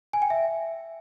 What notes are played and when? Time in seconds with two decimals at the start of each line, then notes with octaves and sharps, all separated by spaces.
0.13 G#5
0.22 G5
0.30 E5